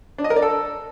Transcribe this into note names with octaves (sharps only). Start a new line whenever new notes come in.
D4
D#5
A#4
D5
A4